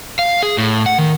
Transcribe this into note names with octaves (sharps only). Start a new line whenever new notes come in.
F5
G#4
A2
F#5
D#3